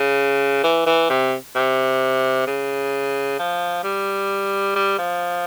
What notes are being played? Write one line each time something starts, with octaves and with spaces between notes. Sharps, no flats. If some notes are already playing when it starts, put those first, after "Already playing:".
Already playing: C#3
E3
E3
C3
C3
C#3
F3
G3
G3
F3